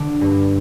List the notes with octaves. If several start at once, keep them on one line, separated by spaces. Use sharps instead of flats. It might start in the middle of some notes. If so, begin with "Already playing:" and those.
Already playing: D3 D6
G2